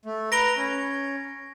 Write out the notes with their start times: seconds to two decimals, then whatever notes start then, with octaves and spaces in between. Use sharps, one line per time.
0.05 A3
0.32 B4 A#5 A#6 D7 G7
0.57 C#4